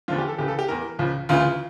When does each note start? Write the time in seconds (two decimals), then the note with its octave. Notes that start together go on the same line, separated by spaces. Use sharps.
0.08 E2 D3 F3 F4
0.18 G4
0.28 A4
0.38 C#2 C#3 E3 G4
0.48 A4
0.59 G4
0.68 E2 E3 A#4
0.99 C#2 C#3 F3
1.29 D2 C#3 E3 F4